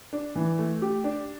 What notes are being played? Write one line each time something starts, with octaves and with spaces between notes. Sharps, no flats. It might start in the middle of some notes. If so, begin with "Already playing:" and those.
D4
E3
A3
G4
D4